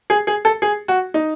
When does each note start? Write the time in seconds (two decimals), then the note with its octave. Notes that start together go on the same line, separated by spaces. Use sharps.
0.10 G#4
0.27 G#4
0.45 A4
0.62 G#4
0.88 F#4
1.14 D#4